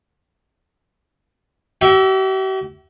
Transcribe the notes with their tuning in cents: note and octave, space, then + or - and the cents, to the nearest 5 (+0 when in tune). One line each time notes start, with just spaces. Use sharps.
G4 -45 E5 +0